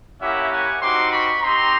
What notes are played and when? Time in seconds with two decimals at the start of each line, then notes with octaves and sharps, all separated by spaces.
0.20 A#3 C#4 E4 G4 E5 F#5
0.51 F#5 G#5
0.82 G3 C4 D#4 F#4 C6 D6
1.12 B5 C#6
1.42 C4 D#4 G4 A#5 C6